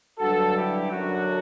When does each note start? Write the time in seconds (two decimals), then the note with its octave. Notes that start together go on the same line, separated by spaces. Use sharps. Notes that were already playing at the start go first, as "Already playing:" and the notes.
0.19 G2 D3 F#3 F#4 A4
0.55 E4 G4
0.92 F#2 D3 F#3 D4 F#4